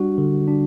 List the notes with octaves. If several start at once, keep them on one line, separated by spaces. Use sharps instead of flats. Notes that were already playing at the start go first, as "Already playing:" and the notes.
Already playing: G3 D4 F#4
D3
D4